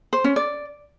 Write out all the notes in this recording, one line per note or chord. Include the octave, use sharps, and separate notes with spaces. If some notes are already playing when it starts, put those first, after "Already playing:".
C5
C#4
D5